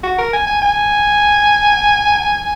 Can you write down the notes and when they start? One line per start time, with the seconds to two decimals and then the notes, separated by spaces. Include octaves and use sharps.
0.03 F#4
0.18 A#4
0.33 G#5
0.47 G#5
0.62 G#5